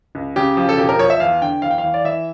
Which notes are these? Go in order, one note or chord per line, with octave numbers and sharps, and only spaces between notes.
C#2
C#3 G4
F3
A4
E1 G4
A#4
F3 C#5
E5
E2 F5
D3 G5
E2 F5
G5
F5
E3
D5
E3 E5